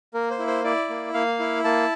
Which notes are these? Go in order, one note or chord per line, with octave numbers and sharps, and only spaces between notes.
A#3 A#4
C5
E4
C5
E4 D5
A#3
A#3 F5
E4
A#3 A5